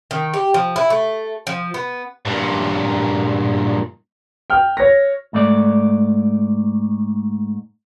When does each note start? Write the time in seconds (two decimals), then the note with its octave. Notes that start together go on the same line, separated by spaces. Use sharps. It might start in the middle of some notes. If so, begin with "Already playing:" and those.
0.11 D#3
0.34 G4
0.54 F3
0.76 E4
0.90 A3
1.47 F3
1.74 B3
2.25 G2 A#2
4.50 G5 F6
4.77 C#5 A#6
5.33 G#2 A3 D5